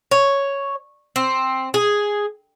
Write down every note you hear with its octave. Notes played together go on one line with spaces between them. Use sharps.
C#5
C4
G#4